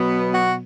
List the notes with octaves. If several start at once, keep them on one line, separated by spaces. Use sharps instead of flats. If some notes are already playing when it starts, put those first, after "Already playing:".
Already playing: B2 F#3 B3
F#4